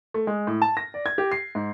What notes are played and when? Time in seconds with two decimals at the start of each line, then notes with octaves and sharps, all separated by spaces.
0.14 A3
0.27 G#3
0.47 A2
0.62 A5
0.77 A#6
0.94 D5
1.06 G#6
1.18 G4
1.32 C7
1.55 G#2